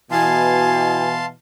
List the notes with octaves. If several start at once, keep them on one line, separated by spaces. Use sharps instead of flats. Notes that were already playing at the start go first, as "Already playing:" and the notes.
B2 E3 F5 G#5 A5 C6